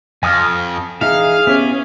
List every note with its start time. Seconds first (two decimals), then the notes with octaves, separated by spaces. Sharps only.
0.23 F2 G#5 D#6 F6
1.01 E3 D#4 E4 G#4 F5
1.47 B3 C#4 E4 G4